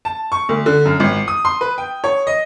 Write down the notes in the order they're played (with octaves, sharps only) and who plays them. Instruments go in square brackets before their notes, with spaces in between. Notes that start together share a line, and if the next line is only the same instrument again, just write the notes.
[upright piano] A5
C#6
D2
D3
F#2
G#1
D#6
C6
B4
G5
C#5
D#5